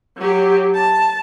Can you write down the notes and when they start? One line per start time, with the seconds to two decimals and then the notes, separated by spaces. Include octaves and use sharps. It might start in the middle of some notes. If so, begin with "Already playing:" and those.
0.18 F#3 G4
0.75 A5